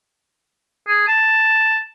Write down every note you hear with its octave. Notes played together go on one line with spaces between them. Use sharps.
G#4
A5